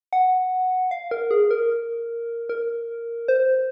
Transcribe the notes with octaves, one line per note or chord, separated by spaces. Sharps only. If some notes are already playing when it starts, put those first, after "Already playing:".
F#5
F5
A#4
G#4
A#4
A#4
C5